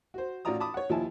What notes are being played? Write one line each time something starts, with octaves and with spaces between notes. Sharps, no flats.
F#4 C5
A1 F4 F#4 D5 A#5 D#6
A5 B5 D6 D#6
C#5 F#5
D#2 F3 E4 G#5 A5